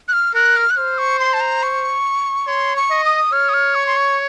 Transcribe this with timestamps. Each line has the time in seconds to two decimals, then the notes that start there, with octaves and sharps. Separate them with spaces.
0.08 F#6
0.13 F6
0.34 A#4 F#6
0.56 F6
0.71 F#6
0.77 C5 F6
0.98 C#6
1.20 C6
1.33 A5
1.41 A#5
1.63 C#6
2.47 C#5 C6
2.76 C#6
2.90 D#5
3.04 D#6
3.32 C#5 F6
3.49 D#6
3.54 F6
3.75 C#6
3.87 C6
3.97 C#6